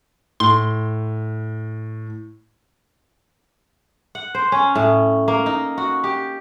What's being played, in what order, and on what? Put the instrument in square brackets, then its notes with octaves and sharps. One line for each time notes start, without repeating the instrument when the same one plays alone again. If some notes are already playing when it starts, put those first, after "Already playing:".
[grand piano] A2 [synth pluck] C6
[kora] F#5
C5
C#4
A2
A#3
D#4
F#4
G4